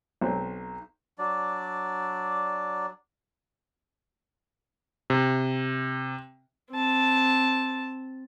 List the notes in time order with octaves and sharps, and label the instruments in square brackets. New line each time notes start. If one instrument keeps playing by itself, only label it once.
[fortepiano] B1 C4
[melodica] F#3 D4 D5
[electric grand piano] C3
[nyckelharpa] C4 A5